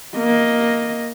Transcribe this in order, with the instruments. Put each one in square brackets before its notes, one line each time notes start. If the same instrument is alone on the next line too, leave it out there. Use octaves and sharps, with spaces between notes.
[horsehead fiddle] A#3 D#5